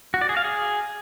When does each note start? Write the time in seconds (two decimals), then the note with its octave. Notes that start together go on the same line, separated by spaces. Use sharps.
0.14 F#4
0.21 D5
0.29 G#4
0.37 F5
0.44 G#4